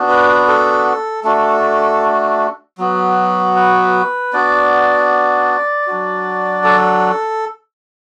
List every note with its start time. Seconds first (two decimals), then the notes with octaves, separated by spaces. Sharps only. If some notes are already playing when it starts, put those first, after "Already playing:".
Already playing: B3 D4 F#4
0.08 B4
0.48 A4
1.24 A3 D4 F#4 A4
2.78 F#3 B3 F#4
3.56 B4
4.33 B3 D4 F#4 D5
5.87 F#3 D4 F#4
6.64 A4